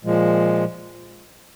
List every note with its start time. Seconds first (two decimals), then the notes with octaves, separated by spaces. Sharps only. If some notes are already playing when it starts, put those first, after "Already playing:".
0.04 A#2 F3 G#3